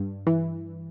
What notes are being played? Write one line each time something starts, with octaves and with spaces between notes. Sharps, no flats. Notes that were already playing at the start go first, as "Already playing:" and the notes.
Already playing: G2
E3